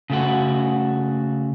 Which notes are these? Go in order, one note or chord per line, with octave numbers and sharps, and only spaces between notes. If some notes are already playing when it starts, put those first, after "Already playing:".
C#3 A3 F#4